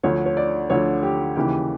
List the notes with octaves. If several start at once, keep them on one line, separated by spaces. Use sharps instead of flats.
D2 D3 F3 C#5
C#5
D5
D2 D3 F3 C#5
G4
D#2 C#3 E3 G4